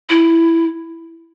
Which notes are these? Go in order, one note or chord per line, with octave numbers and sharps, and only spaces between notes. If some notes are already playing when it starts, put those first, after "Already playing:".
E4